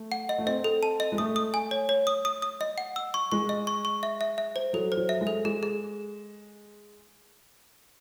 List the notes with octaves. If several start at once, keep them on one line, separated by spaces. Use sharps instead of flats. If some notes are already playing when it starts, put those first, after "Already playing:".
Already playing: A3
F#5
D#5
A3
C4 D#5
A4
A5
D#5
G#3
A3 D#6
D#6
G#5
C#5
C#5
D#6
D#6
D#6
D#5
F#5
E6
C#6
G#3 C#6
D#5
C#6
C#6
E5
E5
E5
C5
F#3 A4
C5
F#3
E5
G#3
A4
G#3 G#4
G#4